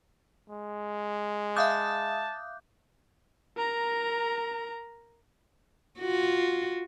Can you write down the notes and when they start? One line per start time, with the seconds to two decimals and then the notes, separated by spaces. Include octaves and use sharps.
0.50 G#3
1.56 E5 F5 A5 D6 D#6 F#6 G6
3.57 A#4 A#5
5.99 F4 F#4